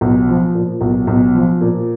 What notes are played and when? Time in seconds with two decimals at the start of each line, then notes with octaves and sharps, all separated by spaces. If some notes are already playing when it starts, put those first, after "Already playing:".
0.01 B1
0.28 F3
0.55 A#2
0.81 B1
1.07 B1
1.35 F3
1.61 A#2